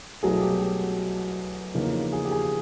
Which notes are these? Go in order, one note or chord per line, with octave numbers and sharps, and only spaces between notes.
C2 B2 F#3 A3 G#4
G4
G4
E2 C#3 F3 A#3 D#4
G#4
G4
G#4